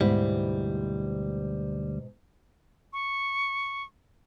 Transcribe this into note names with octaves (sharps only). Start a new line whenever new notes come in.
D2 G#2 B2 G3 E4
C#6